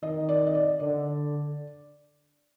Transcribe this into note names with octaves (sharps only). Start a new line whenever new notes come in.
D#3 D#5
D5
D#5
D5
D3 D5